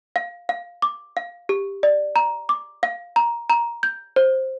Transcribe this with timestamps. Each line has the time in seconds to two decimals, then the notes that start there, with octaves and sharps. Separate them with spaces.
0.16 F5
0.49 F5
0.82 D6
1.17 F5
1.49 G4
1.83 D5
2.16 A#5
2.49 D6
2.83 F5
3.16 A#5
3.50 A#5
3.83 G6
4.16 C5